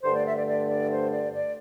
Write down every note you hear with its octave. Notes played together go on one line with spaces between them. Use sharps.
G2 D3 A3 C5
D5
E5
D5
D5
D5
C5
D5
D5